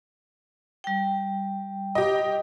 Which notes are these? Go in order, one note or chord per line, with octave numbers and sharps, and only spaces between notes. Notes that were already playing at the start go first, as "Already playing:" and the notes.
G3 G5
G4 D#5